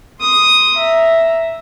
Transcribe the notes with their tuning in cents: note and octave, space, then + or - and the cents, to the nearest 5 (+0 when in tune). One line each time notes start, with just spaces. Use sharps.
C6 +0 D#6 +0
E5 +0 A#5 +0